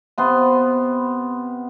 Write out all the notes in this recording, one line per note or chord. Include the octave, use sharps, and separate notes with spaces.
C3 B3 C6